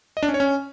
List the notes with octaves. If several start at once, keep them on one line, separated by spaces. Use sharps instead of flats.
D#5
D4
C#4
C#5
C#4